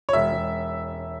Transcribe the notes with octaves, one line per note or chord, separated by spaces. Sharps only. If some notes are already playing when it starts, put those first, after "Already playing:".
C#5
E1 E5
E1